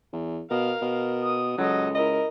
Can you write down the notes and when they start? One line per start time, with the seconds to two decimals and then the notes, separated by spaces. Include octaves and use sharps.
0.13 E2
0.51 B2 A#4 F5
0.82 B2
1.23 D#6
1.58 C#2 F#3 A4 D#5
1.95 E4 A#4 D#5